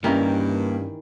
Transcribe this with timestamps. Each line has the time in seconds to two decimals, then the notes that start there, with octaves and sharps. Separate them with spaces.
0.04 G2 D#3 E3 A#3 C#4 D#4 G4 A#4